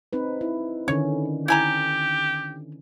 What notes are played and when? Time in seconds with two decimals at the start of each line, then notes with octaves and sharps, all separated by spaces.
0.13 C4 D#4 B4
0.41 E4
0.88 D3 D#3 C#4 C#5
1.48 E4 G4 G#5 A#5